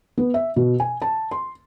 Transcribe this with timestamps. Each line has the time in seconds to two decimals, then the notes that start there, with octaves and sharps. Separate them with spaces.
0.18 B3
0.34 E5
0.56 B2
0.80 G#5
1.02 A5
1.31 C6